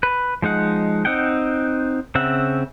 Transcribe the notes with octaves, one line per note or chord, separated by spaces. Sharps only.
B4
F3 G#3 D#4 F#5
C4 D#4 F#5 G5
C#3 C4 E5 F#5